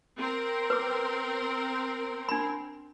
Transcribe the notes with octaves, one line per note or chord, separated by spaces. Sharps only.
C4 A#4
B4 D6
D4 B5